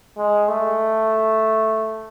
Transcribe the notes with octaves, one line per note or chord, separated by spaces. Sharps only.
G#3
A3